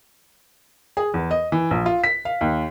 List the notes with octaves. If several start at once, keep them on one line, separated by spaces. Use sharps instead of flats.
G#4
E2
D#5
E3
A#1
F4
B6
F5
D#2